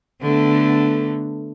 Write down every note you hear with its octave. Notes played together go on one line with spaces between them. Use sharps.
D3 A3 B3